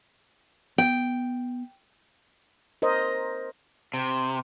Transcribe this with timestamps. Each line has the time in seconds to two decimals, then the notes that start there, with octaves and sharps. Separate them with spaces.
0.78 B3 G5
2.82 A#4 C5 D#5
3.94 C3